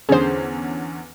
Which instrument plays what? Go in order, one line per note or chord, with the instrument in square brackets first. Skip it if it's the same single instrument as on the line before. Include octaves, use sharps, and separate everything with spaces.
[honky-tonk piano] E2 D3 C#4 [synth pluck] G#4 C5